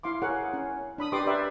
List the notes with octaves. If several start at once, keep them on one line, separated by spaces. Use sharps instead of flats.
E4 F5 C6 D6
G#4 A#4 C#5 F5 F#5
C#4
D4 B5 D#6
G4 B4 D5 C6 D6 D#6
A#4 B4 D5 E5 G5 C6